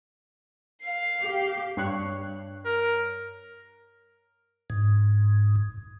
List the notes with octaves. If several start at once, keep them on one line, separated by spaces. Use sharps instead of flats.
F5 C7
G4
G2 C#5 F#6
A#4
G#2